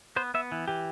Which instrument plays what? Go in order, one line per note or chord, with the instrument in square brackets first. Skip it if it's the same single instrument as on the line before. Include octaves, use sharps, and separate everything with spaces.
[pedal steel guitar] B3 C5
B3 E5
E3
E3 G4